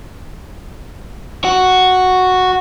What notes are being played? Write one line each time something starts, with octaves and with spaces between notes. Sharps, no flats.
F#4